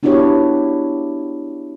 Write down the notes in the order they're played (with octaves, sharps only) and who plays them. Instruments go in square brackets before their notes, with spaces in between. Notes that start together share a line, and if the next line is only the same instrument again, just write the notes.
[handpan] B3 D4 E4 F#4 G4 C#5